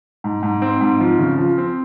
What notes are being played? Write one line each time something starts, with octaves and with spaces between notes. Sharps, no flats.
G#2
G#2
C4
G#2
F3
C#3
F3
C4